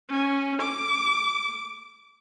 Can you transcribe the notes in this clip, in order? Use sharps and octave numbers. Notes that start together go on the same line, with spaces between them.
C#4
D6